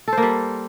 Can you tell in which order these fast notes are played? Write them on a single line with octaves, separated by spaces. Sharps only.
A4 C5 A#3 G3